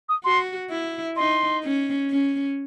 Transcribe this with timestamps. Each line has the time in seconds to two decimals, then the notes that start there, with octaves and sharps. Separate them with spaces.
0.09 D#6
0.24 F#4 C6
0.70 E4
1.17 D#4 C6
1.64 C#4
2.09 C#4